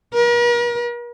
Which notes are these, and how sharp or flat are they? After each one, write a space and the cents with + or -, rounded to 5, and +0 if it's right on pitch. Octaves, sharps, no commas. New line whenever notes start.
A#4 +45